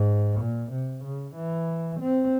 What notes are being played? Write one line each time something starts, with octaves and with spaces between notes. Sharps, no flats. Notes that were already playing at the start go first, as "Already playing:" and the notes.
Already playing: G#2
A#2
C3
C#3
E3
C4